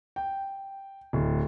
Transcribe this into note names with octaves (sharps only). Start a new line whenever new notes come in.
G5
D1